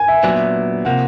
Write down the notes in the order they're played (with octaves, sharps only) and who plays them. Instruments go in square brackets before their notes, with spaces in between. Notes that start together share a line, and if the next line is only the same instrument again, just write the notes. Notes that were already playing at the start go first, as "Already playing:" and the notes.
Already playing: [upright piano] G#5
E5
[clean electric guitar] A#2 F#3 B3 D4 [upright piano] E5
[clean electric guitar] C3 F3 A#3 [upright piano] F#5